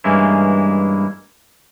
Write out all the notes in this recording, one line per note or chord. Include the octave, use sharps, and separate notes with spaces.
G2 E3 G#3 A#3 C#4 E4